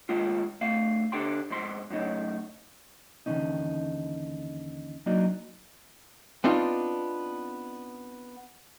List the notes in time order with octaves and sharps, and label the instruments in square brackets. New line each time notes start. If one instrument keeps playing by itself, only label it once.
[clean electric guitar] D#2 G#3 F4
C#3 A3 F5
D3 G4 G5 C6
F2 G#2 C6
F#2 A2 C#3 D#4
D#2 D3 E3 G3 C#4 D#4
F#3 A#3 D4 D#4 F#4 D5
[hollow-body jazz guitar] B3 C4 D4 D#4 F4